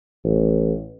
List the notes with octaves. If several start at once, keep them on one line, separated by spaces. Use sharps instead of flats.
A1